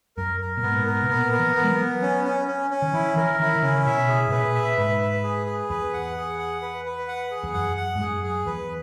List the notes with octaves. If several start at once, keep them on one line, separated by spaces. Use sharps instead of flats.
F#2 A#4
A#4
A#2
G#2 B3
A#4
B2
A#2 B3
A#4
E3
B3
G#3
F#3
B3
C#4
C#4
C#4
C#4
D#3
E3 E4
E3 A#4
D#3 E4
D#3
C#3 C#4
B2 E5
G#4
G#2
A#2 B4
E5
G#2 B4
B4
G#4
G#4
E2 B4
F#5
G#4
F#5
B4
B4
F#5
G#4
E2
F#2 F#5
F#5
G#2
F#2 G#4
G#4
E2 B4